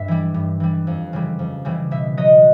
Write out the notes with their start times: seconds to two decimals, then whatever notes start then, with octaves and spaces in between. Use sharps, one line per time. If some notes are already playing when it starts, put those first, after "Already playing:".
Already playing: G2 E5
0.08 E3 G3
0.34 G2
0.60 E3 G3
0.87 F2
1.13 C#3 E3 G3
1.39 F2
1.65 C#3 E3 G3
1.91 B2 E5
2.17 F#3 D#5